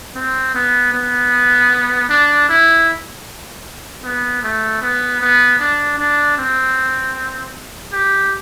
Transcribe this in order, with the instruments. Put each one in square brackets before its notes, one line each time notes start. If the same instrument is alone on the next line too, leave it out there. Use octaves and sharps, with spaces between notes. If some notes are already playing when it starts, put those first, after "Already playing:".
[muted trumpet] C4
B3
B3
D4
E4
B3
A3
B3
B3
D4
D4
C4
G4